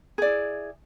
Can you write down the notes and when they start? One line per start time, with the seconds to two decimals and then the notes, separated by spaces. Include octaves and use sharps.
0.18 G#4
0.22 D5
0.26 E4